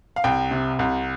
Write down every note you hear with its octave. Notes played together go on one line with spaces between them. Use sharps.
F5
C2 G5
C3
C2